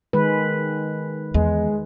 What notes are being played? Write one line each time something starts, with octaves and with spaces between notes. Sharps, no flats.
D#3 G#3 B4
E2 G#3